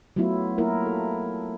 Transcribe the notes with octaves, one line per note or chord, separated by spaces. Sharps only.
F#3 A3 B3 E4 F4
A#3 E4 F4 A#4
A4